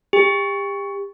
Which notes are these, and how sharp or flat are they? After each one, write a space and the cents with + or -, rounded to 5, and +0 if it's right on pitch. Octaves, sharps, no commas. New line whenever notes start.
G4 +35